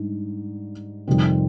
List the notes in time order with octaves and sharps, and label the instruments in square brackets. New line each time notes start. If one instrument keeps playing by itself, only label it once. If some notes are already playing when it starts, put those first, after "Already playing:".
Already playing: [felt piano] G#2 G3 D4
F2 C3 D#3 G3 C4